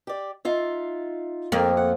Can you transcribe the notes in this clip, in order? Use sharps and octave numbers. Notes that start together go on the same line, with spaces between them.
G4 D5
D#4 F4 E5
F2 A#3 C4 A#4
F#5